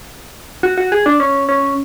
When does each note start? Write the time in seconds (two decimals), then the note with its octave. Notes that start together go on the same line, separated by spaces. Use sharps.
0.63 F#4
0.78 F#4
0.92 G#4
1.06 D4
1.20 C#4
1.49 C#4